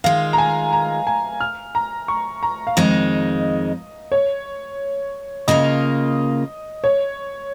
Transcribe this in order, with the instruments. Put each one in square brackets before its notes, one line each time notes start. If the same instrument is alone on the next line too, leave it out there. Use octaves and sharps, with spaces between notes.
[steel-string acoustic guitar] D#3 G#3 F4 [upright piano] F5
[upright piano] A#5
G#5
A#5
G#5
F6
A#5
C#6
A#5
F5
[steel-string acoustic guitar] F2 D#3 G#3 D#4 [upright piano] D#5
[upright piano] C#5
[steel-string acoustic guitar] C#3 A#3 F4 [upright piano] D#5
[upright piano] C#5